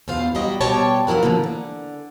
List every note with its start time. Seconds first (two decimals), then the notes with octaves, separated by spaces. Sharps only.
0.08 E2 B2 F4 C5 F5
0.35 F#3 G3 E4 F#4 G4 D#5
0.61 B2 G3 G4 C5 C#5 A5
1.07 F3 F#3 E4 A#4 F#5
1.23 D3 E3 F3 A#3 C4
1.44 D3